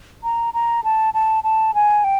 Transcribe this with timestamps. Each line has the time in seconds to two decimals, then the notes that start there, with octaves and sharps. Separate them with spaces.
0.24 A#5
0.54 A#5
0.84 A5
1.14 A5
1.44 A5
1.74 G#5
2.04 G5